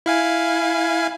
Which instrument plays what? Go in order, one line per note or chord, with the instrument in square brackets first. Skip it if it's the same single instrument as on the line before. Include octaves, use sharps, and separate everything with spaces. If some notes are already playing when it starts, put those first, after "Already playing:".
[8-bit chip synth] E4 F5 G#5